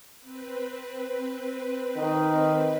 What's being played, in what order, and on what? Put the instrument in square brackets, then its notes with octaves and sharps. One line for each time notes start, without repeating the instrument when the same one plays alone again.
[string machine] C4 B4
[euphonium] D#3